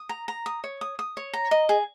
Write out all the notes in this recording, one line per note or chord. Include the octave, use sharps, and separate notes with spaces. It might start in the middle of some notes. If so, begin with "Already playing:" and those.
Already playing: D#6
A#5
A#5
D#6
C#5
D#6
D#6
C#5
A#5
D#5
G#4